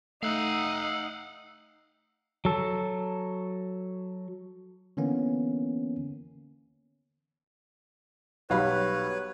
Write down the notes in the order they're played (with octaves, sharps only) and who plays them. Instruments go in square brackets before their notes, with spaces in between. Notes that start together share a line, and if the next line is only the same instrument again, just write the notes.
[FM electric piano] A3 [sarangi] D#4 [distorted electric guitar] F5 F#5 [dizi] E6
[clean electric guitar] F#3 A4
[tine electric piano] D3 E3 A#3 B3 C#4
[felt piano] B1 F5 B5 [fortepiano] F#3 G3 B3 [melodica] B4 C#5